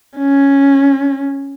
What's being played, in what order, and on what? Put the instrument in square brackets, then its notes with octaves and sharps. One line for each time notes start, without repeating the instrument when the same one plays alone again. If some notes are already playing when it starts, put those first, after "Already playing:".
[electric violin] C#4